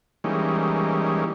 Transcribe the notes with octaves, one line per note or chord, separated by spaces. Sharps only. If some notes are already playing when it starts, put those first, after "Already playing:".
E3 G3 G#3 A#3 C#4 D#4